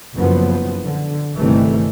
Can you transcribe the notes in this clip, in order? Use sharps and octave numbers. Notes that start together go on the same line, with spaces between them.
F#1 F#2 F3 B3
D3
G1 C3 D#3 E3 G3 A3